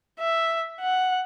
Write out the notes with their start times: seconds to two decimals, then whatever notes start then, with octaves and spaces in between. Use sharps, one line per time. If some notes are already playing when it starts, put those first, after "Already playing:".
0.20 E5
0.81 F#5